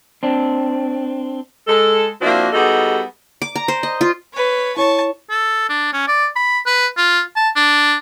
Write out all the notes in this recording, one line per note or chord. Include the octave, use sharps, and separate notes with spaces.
C4 D4
G#3 A4
F3 A#3 C4 D4 E4 F#4
G3 B3 D#4 F#4 G#4 A4
D6
A#5
C5
D#5
F4
B4 C#5
E4 C#5 A5 C#6
A4
D4
C#4
D5
B5
B4
F4
A5
D4